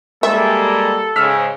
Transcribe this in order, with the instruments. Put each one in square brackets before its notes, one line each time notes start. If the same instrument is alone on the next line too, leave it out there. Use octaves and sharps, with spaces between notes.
[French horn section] G3 G#3 A#3 [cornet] A4 [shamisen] E5
[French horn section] G#2 C#3 [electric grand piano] E6 F6 B6